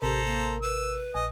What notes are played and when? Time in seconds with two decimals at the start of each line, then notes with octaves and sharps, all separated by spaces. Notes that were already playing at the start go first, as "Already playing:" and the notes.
0.02 A1 C3 G4 A4 A#4 C5 A#5
0.25 A#3
0.62 B4 E6
1.14 A#1 D#5 G#5